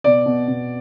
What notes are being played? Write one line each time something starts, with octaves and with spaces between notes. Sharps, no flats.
B2 D5
B2
B2